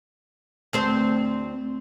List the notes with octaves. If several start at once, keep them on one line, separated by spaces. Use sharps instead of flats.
D2 C4 C5